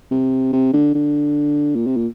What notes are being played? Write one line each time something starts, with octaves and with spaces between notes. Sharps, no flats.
C3
C3
D3
D3
A#2
C3
A#2